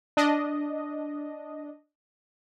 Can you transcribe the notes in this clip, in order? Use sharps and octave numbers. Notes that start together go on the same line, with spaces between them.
D4 D#5